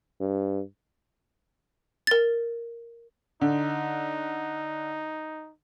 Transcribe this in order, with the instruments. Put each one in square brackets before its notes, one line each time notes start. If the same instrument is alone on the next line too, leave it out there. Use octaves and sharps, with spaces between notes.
[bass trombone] G2
[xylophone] A#4 A6
[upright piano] D3 [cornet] D#4